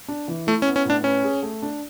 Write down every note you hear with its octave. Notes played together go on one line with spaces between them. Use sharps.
D4
E3
A3 E4
C#4
B3
C#4
A2 D4
C#4 B4
G#4
A3
D4